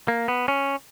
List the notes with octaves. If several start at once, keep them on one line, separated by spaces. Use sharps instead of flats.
A#3
B3
C#4